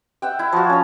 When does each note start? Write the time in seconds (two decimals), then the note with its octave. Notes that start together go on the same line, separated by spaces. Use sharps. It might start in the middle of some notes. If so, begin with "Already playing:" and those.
0.22 E5 F#5 G5
0.39 E4
0.53 F3 F#4
0.70 C#4 C#5